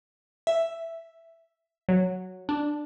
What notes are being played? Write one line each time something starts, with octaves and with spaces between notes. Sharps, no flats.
E5
F#3
D4